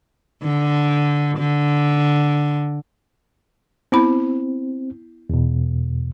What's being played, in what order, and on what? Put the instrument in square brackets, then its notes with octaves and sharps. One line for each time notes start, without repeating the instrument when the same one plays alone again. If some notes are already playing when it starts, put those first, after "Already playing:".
[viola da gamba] D3
D3
[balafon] B3 E4 B5 [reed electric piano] C4
[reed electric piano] E2 B2